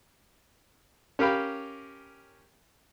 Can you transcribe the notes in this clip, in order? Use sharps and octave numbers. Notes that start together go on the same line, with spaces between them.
C#4 G4 A#4 F5 G5 B5